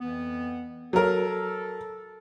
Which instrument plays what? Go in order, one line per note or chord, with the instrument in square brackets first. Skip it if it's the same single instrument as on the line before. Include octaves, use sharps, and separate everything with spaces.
[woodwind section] F2 E3 B3
[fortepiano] F#3 A#4 [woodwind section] A4